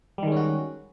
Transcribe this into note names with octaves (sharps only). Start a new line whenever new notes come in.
D#3 G3 G#3 C#4 F#4